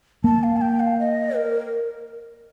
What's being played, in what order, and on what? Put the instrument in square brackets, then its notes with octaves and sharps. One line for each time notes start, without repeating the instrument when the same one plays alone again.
[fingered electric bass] A#3 [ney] A5
[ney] F5
A5
G5
F5
D#5
A#4